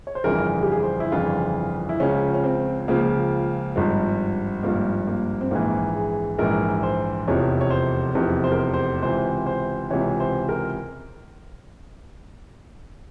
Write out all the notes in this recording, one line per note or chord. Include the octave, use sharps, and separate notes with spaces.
C#5
C5
G1 F2 C#3 E3 A#4
G#4
G4
G#4
C5
E4
G1 F2 C#3 E3 F4
E4
C#2 C#3 F3 C#4
C#4
C4
C#2 C#3 F3 A#3
G#1 G2 F3
G#1 G2 F3 A#3
A#3
C4
A#1 G#2 E3 A#3
G#4
A#1 G#2 E3 A#4
C5
F1 E2 C3 F3 C#5
C#5
C5
F1 E2 C3 F3
C5
A#4
C5
C5
C#2 C3 E3 C5
C5
C#2 C3 E3 C#5
C5
A#4